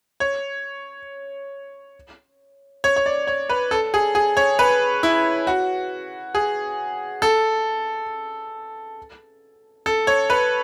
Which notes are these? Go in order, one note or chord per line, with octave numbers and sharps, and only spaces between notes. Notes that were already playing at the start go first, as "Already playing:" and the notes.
C#5
C#5
C#5
D5
C#5
B4
A4
G#4
G#4
C#5
B4
E4
F#4
G#4
A4
A4
C#5
B4